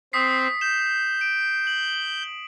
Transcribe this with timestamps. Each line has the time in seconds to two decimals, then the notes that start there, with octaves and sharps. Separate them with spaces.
0.13 C4 D#6 B6 C7
0.61 G6 E7
1.21 D7
1.67 F#7